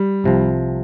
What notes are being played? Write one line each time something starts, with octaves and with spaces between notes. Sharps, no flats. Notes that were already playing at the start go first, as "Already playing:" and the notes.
Already playing: G3
C2 C3 F3